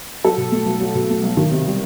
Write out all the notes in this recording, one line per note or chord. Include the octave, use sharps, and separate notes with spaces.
F#3 A4
B2
A3
B1
F#3
B2
A3
B1
D#3
C3
G3